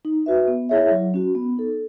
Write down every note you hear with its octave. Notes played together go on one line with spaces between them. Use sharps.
D#4
F#4 B4 E5
B3
E4 G#4 C#5 E5
F#3
C#4 F#4
B3
D#4 A4